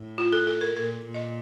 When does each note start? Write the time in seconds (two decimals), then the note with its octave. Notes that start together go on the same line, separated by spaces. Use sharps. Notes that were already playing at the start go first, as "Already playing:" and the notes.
Already playing: A2
0.18 F4
0.33 A4
0.47 A4
0.61 A#4
0.76 A#2 A#4
1.06 A#2
1.14 D#5